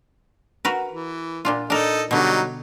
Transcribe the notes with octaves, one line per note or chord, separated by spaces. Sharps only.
F#4 A#4 B4
E3
A#2 D4 F4
D4 D#4 A4 A#4 D#5
B2 D3 F#3 G3 D#4